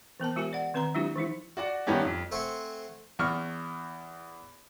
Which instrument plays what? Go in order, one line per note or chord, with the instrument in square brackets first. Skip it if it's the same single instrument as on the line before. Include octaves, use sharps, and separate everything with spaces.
[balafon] E3 B3 A#4 A5
G#3 F4 G4 A#4 G#5
D5 F#5
D#3 C4 B4 A#5 C6
F#3 G#3 D4 E4 F4 G4
E3 G#3 D#4 E4
[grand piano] F#4 D5 F#5
G2 D#3 B3 C#4 G4
F2
[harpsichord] A3 C4 C5 F#5 G#5
[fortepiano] E2 C#6 F6